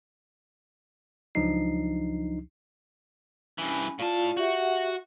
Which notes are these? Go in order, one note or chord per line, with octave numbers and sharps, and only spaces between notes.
C#2 F3 F#3 D4 D#4 C7
G2 E3 C#4 G#5 B5
A2 F4 D5 F5 A5
F#4 G4 E5 F#5